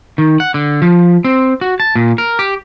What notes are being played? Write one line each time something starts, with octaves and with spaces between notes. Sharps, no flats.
D#3
F#5
D3
F3
C4
F#4
A5
A#2
A#4
G4